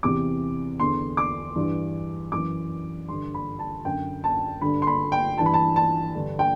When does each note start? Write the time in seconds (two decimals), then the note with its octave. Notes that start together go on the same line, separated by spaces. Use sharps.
0.03 E2 C3 E3 D6
0.80 E2 D3 C6
1.17 D6
1.56 G2 E3
2.32 F#2 E3 D6
3.09 G2 D3 C6
3.34 B5
3.59 A5
3.84 F#2 D3 G5
4.24 A5
4.61 G2 D3 B5
4.82 C6
4.87 B5
5.12 G5
5.38 G2 E3 A5
5.46 B5
5.54 A5
5.76 A5
6.15 G2 D3
6.39 G5